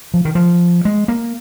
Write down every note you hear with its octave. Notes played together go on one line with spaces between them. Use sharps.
F3
D#3
F3
G#3
A#3